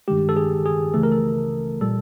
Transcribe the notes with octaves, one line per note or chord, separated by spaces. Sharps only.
G2 D#3 G#3 G4
A4
G#4
G#4
C#2 C#3 E3 A3 A4
A#4
A4
A#2 G3 A4